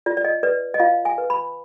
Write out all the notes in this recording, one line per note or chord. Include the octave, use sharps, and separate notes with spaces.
F4 D5
D5
D#5
B4 D5
D#5
F4 F5
G#5
B4
B5